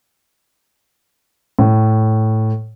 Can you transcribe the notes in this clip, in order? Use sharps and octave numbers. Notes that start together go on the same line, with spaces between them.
A2